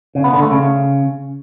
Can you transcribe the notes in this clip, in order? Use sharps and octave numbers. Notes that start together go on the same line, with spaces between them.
C#3
B3
D3
A3
C#3